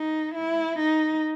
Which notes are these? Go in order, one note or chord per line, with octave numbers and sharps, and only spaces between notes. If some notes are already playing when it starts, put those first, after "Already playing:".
Already playing: D#4
E4
D#4